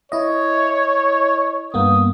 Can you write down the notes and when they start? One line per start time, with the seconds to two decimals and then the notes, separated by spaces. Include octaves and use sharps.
0.12 E4 C#5 D#5
1.74 G2 A#3 B3 D#6